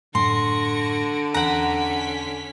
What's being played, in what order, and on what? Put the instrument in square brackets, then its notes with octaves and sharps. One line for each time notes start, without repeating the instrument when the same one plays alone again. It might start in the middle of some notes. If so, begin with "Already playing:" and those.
[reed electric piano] F#2 A2 [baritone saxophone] D3 [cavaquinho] C6 [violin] C#6 A#6
[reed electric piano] E2 F#6 [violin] C#4 B6 [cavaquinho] F#5 A#5